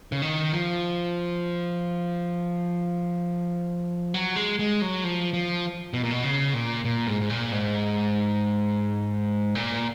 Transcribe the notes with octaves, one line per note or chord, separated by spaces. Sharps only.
C#3
D#3
F3
F#3
G#3
G#3
F#3
F3
F3
B2
A#2
B2
C#3
A#2
A#2
G#2
G#2
A#2
G#2
A#2